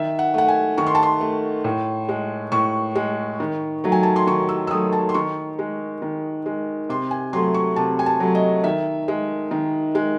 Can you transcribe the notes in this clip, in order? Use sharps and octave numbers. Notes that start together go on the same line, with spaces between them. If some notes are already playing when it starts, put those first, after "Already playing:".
Already playing: D#3 E5
F#5
A3 F#5
G#5
D#3 C#6
C6
A5
C6
A3
A2
G#3
A2 C#6
G#3
D#3
F#3 A3
G#5
A5
C6
D#3 C#6
E6
E6
F#3 A3 D#6
A5
C6
D#3 C#6
G#3
D#3
G#3
C3 C6
G#5
F#3 A3 C6
C#6
C3 A5
G#5
A5
F#3 A3
D#5
D#3 E5
G#3
D#3
G#3